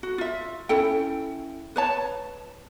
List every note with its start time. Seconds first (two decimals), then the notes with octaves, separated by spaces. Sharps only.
0.03 F#4
0.18 F4 E5
0.69 C#4 E4 A4 G5
1.76 B4 C#5 A5